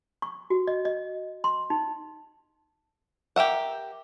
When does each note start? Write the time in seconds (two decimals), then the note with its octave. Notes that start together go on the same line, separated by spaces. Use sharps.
0.22 C#6
0.50 F#4
0.67 D#5
0.85 D#5
1.44 C6
1.70 D#4
3.36 G4 A#4 E5 F#5